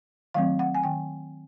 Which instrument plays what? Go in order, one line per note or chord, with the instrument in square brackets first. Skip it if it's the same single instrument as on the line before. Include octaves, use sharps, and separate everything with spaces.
[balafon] D#3 F#3 A3 C4 F5
F#5
G#5
D#3 G5